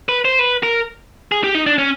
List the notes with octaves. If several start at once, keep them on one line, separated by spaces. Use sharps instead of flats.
B4
C5
B4
A#4
G#4
G4
D#4
D4
C#4